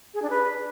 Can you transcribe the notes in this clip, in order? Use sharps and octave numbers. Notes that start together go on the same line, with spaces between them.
G#4
D4
B4